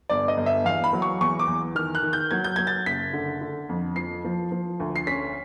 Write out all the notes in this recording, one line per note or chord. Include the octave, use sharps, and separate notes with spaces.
G1 D5
D#5
G1
E5
E2 F5
B5
F#3
C#6
E2 C#6
D6
E2
D#3 F6
F#6
D#3
G6
F#3 G#6
G6
F#3 G#6
A6
F#1 B6
D3
D3
F2
F3 C7
F3
F3
D2
C7
C#4 B6